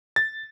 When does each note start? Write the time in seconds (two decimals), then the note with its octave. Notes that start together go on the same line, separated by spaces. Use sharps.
0.16 A6